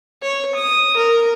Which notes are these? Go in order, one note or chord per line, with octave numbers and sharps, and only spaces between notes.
C#5
D#6
A#4